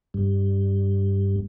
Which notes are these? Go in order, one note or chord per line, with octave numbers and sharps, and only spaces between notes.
G2